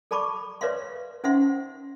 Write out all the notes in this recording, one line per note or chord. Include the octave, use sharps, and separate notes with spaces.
A4 D5 A5 B5 C#6 D6
B4 C#5 D5 E5 F5 C6
C#4 D#4 C5 E5 F#5 C6